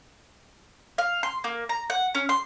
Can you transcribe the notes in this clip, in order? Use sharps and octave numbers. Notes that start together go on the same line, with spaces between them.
F5
C6
A#3
A#5
F#5
C#4
C6